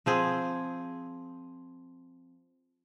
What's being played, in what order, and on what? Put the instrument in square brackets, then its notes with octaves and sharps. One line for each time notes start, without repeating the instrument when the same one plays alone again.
[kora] F3 C4 G#4